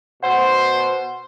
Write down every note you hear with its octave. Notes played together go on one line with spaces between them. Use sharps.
B2 C5 F#5